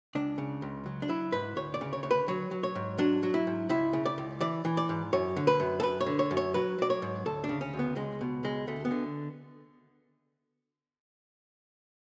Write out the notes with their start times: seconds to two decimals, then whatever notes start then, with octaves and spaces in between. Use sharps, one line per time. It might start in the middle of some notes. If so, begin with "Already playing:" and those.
0.15 C#2 D4
0.38 C#3
0.62 C#2
0.86 F#3
1.02 D4
1.09 F#3 E4
1.32 G#2 B4
1.56 D2 C#5
1.74 D5
1.81 C#3
1.93 C#5
2.03 D2 C#5
2.11 B4
2.28 F#3 C#5
2.51 F#3
2.63 C#5
2.75 G#2
2.98 F#3 D4
3.23 F#3
3.34 E4
3.47 G#2
3.69 C#2 E4
3.93 C#3
4.06 D5
4.18 C#2
4.41 E3 D5
4.65 E3
4.77 D5
4.89 G#2
5.13 F#2 C#5
5.36 D3
5.47 B4
5.60 F#2
5.80 A4
5.83 F#2 B4
6.01 C#5
6.06 D3
6.19 C#5
6.31 F#2
6.37 C#5
6.54 F#3 B4
6.79 F#3 D5
6.90 C#5
7.02 G#2
7.26 D2 A4
7.44 D4
7.49 C#3
7.61 C#4
7.74 D2
7.79 B3
7.96 C#2 G#3
8.21 B2
8.44 C#2 G#3
8.67 D2 A3
8.85 B3
8.91 D3